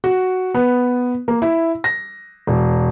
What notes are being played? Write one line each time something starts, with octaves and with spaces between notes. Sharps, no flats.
F#4
B3
A#3
E4
A#6
E1